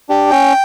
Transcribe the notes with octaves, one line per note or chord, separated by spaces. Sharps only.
D4 G4
C#4 G5